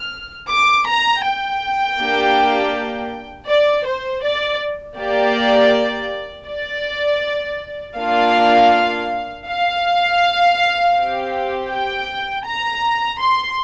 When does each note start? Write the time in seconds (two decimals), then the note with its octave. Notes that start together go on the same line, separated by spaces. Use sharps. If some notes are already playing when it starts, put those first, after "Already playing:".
Already playing: F6
0.49 D6
0.87 A#5
1.24 G5
1.99 A#3 D4 G4
3.48 D5
3.86 C5
4.23 D5
4.98 A#3 G4 D5
6.47 D5
7.96 A#3 D4 F4 F5
9.46 F5
10.95 C4 G4
11.70 G5
12.45 A#5
13.20 C6